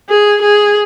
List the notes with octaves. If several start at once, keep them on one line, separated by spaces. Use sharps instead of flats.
G#4
G#4